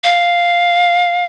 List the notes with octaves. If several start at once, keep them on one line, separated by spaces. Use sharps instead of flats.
F5